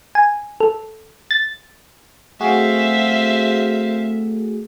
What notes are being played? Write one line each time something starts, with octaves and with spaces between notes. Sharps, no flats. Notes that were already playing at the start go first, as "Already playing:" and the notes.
G#5
A4
A6
A3 C4 F#4 G#4 E5 F5